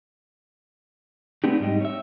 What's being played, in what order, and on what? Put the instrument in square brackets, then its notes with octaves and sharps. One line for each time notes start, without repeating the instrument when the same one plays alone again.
[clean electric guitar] A3 B3 C4 D4 D#4 G4
G#2 G3 D#4 G4
C#5 E5